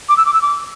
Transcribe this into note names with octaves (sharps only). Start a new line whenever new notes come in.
D6
E6
D6
E6
D6